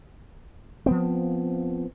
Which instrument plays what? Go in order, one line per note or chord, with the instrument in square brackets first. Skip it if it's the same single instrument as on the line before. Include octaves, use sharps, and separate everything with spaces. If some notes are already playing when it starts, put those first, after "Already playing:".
[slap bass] F3 B3 C4